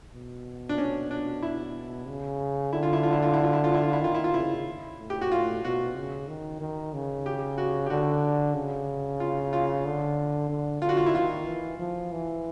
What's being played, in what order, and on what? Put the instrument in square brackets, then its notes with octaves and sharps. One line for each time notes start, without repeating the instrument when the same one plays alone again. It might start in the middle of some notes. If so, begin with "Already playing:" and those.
[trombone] B2
[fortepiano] D4
C#4
D4
E4
[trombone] C#3
[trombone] D3 [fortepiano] E4
[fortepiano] F4
E4
F4
E4
F4
E4
F4
E4
F4
E4
F4
E4
[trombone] D#3 [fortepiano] F4
[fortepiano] E4
F4
[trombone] C#3 [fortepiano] E4
[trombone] A2
[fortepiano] G4
F#4
[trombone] A2 [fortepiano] F4
[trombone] B2 [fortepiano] F#4
[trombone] C#3
D#3
D#3
C#3
[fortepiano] G4
F#4
G4
[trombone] D3 [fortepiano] F#4
[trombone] C#3
[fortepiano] F4
F4
[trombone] D3
D3
[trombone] D3 [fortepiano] F4
[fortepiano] F#4
F4
E4
[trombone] D#3 [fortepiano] F4
[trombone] E3
F3
E3